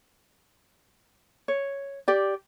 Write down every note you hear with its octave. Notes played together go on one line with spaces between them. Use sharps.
C#5
G4 D5